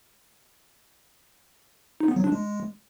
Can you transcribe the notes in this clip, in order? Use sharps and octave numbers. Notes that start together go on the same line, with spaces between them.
D#4
B3
F#3
D4
G#3